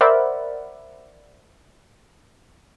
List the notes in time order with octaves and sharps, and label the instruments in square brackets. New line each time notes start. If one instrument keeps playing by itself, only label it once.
[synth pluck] A#4 C5 D5 E5 F#5 B5